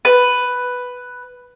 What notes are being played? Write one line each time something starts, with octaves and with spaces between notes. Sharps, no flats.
B4